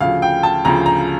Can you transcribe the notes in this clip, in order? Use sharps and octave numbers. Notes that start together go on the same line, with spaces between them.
D2 C#3 F3 F5
G5
A5
D2 C#3 F3 A#5
A#5